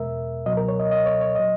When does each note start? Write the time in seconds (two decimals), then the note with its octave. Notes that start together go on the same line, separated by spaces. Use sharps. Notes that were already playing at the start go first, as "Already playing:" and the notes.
Already playing: E2 B2 G#3 A#4 E5
0.46 C#2 B2 F#3 D#5
0.57 A#4
0.68 C#5
0.80 D#5
0.91 D#5
1.06 C#5
1.21 C#5
1.35 A#2 F#3 D#5